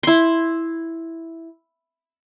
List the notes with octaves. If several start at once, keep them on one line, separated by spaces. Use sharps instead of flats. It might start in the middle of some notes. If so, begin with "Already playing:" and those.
E4 C6